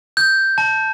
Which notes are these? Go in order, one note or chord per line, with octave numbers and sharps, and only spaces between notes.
G6
A5